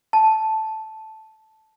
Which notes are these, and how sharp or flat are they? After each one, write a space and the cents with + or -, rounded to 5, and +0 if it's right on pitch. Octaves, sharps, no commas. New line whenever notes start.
A5 -5